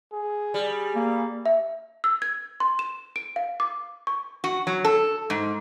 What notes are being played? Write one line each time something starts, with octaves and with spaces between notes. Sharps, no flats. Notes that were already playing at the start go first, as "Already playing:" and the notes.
G#4
G3
A#3
E5
E6
G#6
C6
E7
D7
F5
D6
C#6
F#4
F#3
A4
G#2